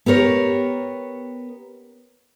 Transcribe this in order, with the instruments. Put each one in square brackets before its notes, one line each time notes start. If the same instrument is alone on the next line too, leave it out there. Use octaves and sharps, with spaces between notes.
[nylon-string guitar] B3 G4 A#4 C#5